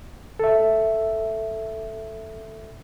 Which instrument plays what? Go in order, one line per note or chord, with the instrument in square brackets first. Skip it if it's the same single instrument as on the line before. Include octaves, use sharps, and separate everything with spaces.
[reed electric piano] A4 E5